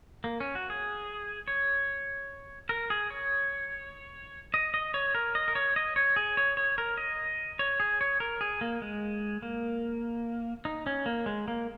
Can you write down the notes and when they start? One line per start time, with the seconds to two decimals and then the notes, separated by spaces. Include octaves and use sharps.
0.24 A#3
0.40 C#4
0.55 F#4
0.70 G#4
1.48 C#5
2.69 A#4
2.90 G#4
3.10 C#5
4.54 D#5
4.74 D#5
4.94 C#5
5.15 A#4
5.35 D#5
5.48 A#4
5.55 C#5
5.76 D#5
5.96 C#5
6.16 G#4
6.37 C#5
6.57 C#5
6.78 A#4
6.97 D#5
7.59 C#5
7.80 G#4
8.01 C#5
8.20 A#4
8.41 G#4
8.61 A#3
8.82 G#3
9.42 A#3
10.65 D#4
10.86 C#4
11.06 A#3
11.26 G#3
11.48 A#3